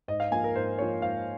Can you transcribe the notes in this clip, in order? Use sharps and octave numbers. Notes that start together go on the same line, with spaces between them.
G#2 D#5
F5
F3 A#3 G#5
A#4
G#2 C5
F3 A#3 C#5
G#2 F5